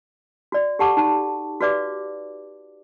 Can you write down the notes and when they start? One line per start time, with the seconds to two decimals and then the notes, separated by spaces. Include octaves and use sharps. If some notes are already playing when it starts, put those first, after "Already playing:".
0.52 F#4 D5
0.79 G4 A4 F#5 A5 C#6 D6
0.97 D#4 F#4 A5 C#6
1.61 F#4 G4 B4 D5 F5 D6